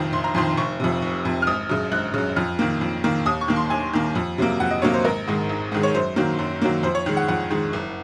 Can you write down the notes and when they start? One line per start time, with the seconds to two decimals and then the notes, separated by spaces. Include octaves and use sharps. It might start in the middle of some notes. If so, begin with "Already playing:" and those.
Already playing: F1 F2 D#3
0.13 F1 C6
0.24 A#5
0.35 F2 D#3 C6
0.57 F1 C#6
0.80 F2 C3
1.02 F1
1.25 F2 C3
1.42 F6
1.47 G#1 D#6
1.69 F#2 C#3
1.92 G#1 F#6
2.14 F#2 C#3
2.36 F2 F6
2.59 D#3 A#3
2.81 F2
3.04 D#3 A#3
3.26 D#2 D#6
3.41 C#6
3.48 D#3 A#3
3.56 C6
3.70 D#2 G#5
3.93 D#3 A#3
4.15 F2
4.38 C3 F#3 A#3
4.60 F2 F#5
4.71 D#5
4.82 C3 F#3 A#3 C#5
4.93 C5
5.04 G#1 A#4
5.27 G#2 D#3 G#3
5.49 G#1
5.72 G#2 D#3 G#3
5.83 C#5
5.94 F#2 C5
6.16 D#3 F#3 A#3
6.39 F#2
6.62 D#3 F#3 A#3
6.83 F2 C5
6.95 C#5
7.06 D#3 G#3
7.17 F#5
7.28 F2 F#5
7.50 D#3 G#3
7.73 F#1